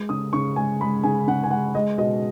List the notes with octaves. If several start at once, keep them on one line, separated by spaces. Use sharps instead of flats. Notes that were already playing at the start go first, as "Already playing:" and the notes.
Already playing: G#3
C#3 D#6
C#3 C#6
G#3 G#5
G#3 B5
C#3 G#5
C#3 F#5
G#5
G#3 F#5
G#3 D#5
B2 D#5